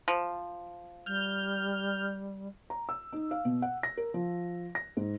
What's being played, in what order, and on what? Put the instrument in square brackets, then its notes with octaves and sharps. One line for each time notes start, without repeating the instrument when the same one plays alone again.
[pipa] F3
[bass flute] G3 [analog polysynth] F6 G6
[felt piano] A#5
E6
D#4
F5
B2
F#5
A#6
A#4
F3
A#6
G#2